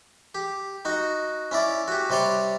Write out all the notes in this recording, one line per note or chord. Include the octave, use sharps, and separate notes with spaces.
G4
D#4 F#4
C#4 E4 D5
F#4 G4
C3 G3 C#5 D5 C6